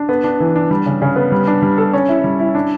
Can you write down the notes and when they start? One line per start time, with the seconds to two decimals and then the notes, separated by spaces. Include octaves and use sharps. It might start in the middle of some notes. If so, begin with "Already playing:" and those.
Already playing: D4
0.09 B3
0.24 D4
0.40 E3
0.56 D4
0.71 G3
0.86 C#3
1.02 C#3
1.16 B3
1.32 G3
1.47 D4
1.62 G3
1.78 A4
1.93 C#4
2.09 E4
2.24 G3
2.39 E4
2.55 D4